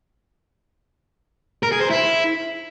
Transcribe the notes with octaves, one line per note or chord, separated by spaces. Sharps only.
A#4
G#4
C5
E4